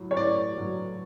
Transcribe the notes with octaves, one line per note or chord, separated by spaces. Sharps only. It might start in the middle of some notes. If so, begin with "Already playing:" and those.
Already playing: A2 F#3
C#5
A2 D5
F#3